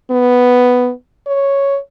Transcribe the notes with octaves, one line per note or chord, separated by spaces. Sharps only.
B3
C#5